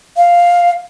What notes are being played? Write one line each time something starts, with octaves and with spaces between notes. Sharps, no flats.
F5